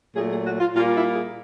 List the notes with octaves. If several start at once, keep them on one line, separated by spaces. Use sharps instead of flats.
A#2 F#3 A3 G#4
G#4
F#4
F4
A#2 G3 A#3 F4
E4
G#4